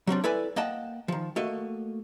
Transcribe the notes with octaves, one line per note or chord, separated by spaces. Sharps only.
F#3 G3 C4 D4
E4 A4 B4 D5 G#5
A#3 D#5 F#5 G5 A5
D#3 F3
A3 A#3 F#4 D#5